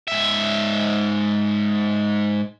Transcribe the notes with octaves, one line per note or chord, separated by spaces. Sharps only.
G#2 E5